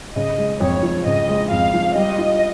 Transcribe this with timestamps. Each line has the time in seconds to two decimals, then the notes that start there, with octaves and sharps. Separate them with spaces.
0.15 C#3 D#5
0.38 G#3
0.61 F2 C#5
0.83 F3
1.06 C#3 D#5
1.29 G#3
1.51 F2 F5
1.74 F3
1.95 G3 D#5
2.18 F4